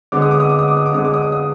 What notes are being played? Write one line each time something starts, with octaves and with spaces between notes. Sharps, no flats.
D3 G#3 B3 D6
D#6
D6
D#6
D6
D#6
D6
D#6
D6
D3 G#3 B3 D#6
D6
D#6
D6
D#6